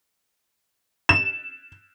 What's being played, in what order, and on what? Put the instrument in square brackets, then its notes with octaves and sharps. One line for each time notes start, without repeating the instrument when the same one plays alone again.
[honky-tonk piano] E7